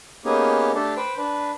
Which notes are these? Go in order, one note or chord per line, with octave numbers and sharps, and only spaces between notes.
A#3 B3 C#4 D#4 G4 G#4
A3 D4 G4 A4
B4 C5 G5
D4 B4